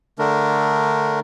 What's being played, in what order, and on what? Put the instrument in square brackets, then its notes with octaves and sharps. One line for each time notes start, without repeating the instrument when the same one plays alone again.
[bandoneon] D3 A3 D4 A#4